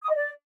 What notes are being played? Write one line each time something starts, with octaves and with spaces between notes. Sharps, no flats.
D#6
D#5
D5